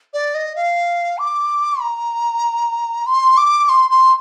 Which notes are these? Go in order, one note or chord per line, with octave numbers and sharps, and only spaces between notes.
D5
D#5
F5
D6
A#5
C6
D6
C6
C6